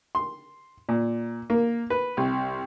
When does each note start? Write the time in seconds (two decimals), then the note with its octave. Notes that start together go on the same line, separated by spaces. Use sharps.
0.15 C6
0.89 A#2
1.50 A#3
1.90 B4
2.17 C2